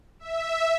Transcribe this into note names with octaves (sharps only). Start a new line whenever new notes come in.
E5